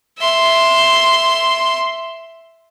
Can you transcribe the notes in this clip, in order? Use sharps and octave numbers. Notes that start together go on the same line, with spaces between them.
E5 C6